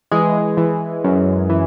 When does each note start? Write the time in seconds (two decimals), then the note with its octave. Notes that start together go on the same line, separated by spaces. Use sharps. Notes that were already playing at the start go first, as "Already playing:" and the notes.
0.12 E3 G#3 G#4
0.57 E3
1.04 F#2
1.50 E3